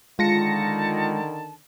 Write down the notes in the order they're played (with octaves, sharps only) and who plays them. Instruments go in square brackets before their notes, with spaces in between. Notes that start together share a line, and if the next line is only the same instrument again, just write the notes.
[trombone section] D3 D#3 [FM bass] G#3 [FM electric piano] F4 A#6 C#7 [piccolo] A5